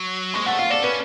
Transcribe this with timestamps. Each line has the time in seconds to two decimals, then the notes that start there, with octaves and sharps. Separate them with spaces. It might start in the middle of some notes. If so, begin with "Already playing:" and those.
Already playing: F#3
0.34 G#3 C#6
0.46 A3 F#5
0.58 F4 F5
0.70 A4 D5
0.83 C#4 B4